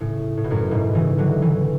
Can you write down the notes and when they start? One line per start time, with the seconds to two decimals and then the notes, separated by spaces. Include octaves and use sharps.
0.01 A2 C#3
0.37 A2
0.44 B2
0.50 F#2 A2
0.71 G#2 B2
0.95 C#3 E3
1.18 D3 F#3
1.41 C#3 E3